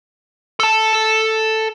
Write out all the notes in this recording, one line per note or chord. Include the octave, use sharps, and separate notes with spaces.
A4 A5